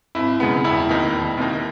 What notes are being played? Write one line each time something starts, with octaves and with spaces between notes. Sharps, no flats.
G#1 E4
F#2 C#3 G#3 B3
E1 E4
D#2 D#3 A#3 D#4
E1
D#2 D#3 A#3 D#4